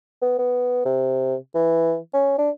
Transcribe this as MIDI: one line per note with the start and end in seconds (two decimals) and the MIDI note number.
0.22 0.36 59
0.39 0.84 59
0.86 1.36 48
1.55 1.97 52
2.14 2.35 61
2.38 2.50 62